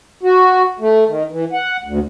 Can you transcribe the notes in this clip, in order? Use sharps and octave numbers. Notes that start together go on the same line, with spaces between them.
F#4
A3
D#3
E3
F#5
D2